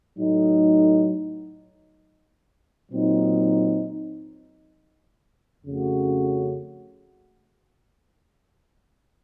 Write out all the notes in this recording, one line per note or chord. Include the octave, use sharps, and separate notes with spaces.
A2 F#3 A3 D#4
A#2 F#3 C4 D#4
F2 C#3 A3 C#4 F#4